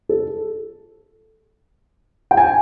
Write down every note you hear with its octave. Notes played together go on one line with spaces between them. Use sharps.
A4
G5
G#5